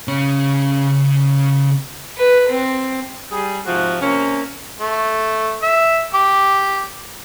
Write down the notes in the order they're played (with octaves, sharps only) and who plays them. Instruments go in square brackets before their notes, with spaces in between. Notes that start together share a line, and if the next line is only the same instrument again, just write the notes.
[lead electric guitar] C#3 C#4
[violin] B4
C4
[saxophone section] G3 G#4
G#2 C3 F3 F#4
C3 A#3 C#4
[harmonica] A3
E5
G4 D6